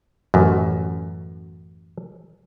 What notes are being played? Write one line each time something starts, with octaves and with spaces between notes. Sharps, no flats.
A1 F#2